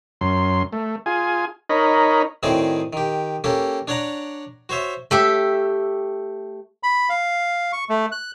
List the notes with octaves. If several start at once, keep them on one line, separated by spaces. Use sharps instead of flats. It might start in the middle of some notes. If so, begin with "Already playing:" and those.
F#2 C6
A3
F4 G#4 G#5
D#4 A#4 C#5 D#5 B5
A2 D#3 C4 F#4 G#4 D5
D#3 G4
A#3 C#4 G4 A4
D4 C#5 D5 F#5 A#5
F#4 C5 C#5 E5
A3 G4 E5
B5
F5
C#6
A3
F#6